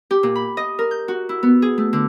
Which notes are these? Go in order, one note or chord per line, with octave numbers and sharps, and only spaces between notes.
G4
A#2
B5
D#5
A#4
G6
F#4
E4
B3
G#4
A3
D3